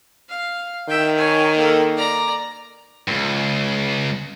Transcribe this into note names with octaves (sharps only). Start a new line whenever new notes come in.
F5
D#3 E5 G5
C#5 G#5
A#3 A4
D5 A#5
C#2 G2